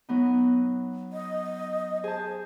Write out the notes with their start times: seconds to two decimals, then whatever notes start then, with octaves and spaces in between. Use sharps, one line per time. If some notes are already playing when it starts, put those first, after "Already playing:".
0.09 F#3 B3 D#4
1.13 D#5
2.04 G#4 C5 A5